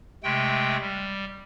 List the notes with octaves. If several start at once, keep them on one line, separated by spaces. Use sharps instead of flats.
C3 G#3 A3 G5
G3